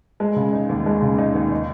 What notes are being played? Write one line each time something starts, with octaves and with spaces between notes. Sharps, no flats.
G#3
C#3
D#4
D#2
G#3
C#3
D#4
D#2
D#4